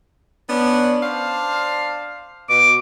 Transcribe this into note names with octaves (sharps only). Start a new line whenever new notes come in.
B3 C#4 D4
D4 C5 F5
B2 D6